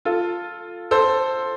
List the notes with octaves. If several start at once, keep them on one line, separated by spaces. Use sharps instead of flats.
F4 A4
A4 C5